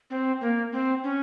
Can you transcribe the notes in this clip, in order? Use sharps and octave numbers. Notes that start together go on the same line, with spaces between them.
C4
A#3
C4
C#4